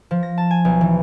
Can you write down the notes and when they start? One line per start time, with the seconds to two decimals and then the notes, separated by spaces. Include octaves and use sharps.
0.11 F3
0.23 A#6
0.38 A5
0.51 G#5
0.65 B1
0.81 E3